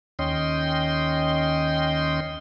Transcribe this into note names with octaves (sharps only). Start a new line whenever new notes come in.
D#2 C#4 D#5 G5 C6